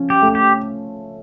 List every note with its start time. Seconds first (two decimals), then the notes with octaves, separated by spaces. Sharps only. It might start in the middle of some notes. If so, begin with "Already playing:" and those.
Already playing: F3 C#4
0.10 G4
0.22 A3
0.35 G4